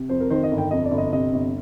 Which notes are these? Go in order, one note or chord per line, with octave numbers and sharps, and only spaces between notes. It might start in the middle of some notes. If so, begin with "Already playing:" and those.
Already playing: C3
F2 C5
A#4
D#3 C5
D#5
G1
G5
F2 D#5
D5
G1
D#5
C3 D#5
G1